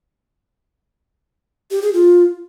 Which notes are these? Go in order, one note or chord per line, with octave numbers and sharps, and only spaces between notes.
G4
G#4
F4